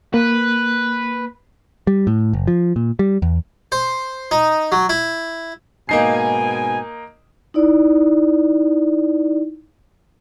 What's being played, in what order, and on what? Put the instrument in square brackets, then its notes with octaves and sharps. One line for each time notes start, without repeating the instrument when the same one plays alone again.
[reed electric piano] A#3 [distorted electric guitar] B4
[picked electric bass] G3
A2
F#1
F3
A#2
G3
E2
[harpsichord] C5
D#4
F#3
E4
[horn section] G#2 B2 G#5 [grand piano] A#3 D#4 C7
[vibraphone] D#4 E4 D5